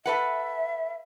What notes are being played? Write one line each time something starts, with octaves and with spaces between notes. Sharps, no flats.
A4 B4 E5 F#5